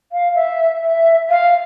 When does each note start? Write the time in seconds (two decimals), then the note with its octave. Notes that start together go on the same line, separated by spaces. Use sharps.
0.12 F5
0.35 E5
0.83 E5
1.30 F5